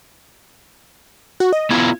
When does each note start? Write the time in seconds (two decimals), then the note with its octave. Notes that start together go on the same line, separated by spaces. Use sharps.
1.40 F#4
1.53 D#5
1.71 B3 E4 F4 G#6